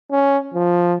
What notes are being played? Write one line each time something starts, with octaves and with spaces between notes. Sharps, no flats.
C#4
F3